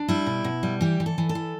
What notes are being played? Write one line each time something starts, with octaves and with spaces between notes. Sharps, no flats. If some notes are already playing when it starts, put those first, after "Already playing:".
Already playing: D4
G3 E4
B2
B2
G3
E3 G4
E3
A4
E3
A4
E3